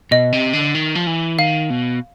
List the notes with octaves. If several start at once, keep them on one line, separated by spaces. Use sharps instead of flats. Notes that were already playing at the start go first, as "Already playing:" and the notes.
B2 D#5
C3
D3
D#3
F3
E3
D#3 F5
B2